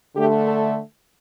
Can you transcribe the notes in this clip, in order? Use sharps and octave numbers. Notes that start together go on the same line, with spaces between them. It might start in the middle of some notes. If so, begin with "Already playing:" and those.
D3 A3 G4
A4